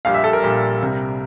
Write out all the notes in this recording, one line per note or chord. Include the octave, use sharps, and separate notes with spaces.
A#1 A#2 G3 F5
E5
A4
A#4
A#1 A#2 G3
C2 C3 G3